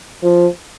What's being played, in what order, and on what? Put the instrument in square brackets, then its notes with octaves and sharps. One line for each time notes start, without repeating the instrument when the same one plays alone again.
[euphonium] F3